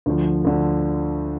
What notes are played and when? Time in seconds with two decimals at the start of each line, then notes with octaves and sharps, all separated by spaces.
0.06 D2 D3 F3
0.45 D2 D3 F3